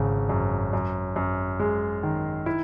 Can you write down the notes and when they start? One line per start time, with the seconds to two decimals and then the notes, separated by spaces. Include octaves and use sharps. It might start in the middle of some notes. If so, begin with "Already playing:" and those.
Already playing: G#1 C#3
0.29 F#2
0.73 F#2
1.16 F#2
1.60 G#3
2.03 D#3
2.46 E4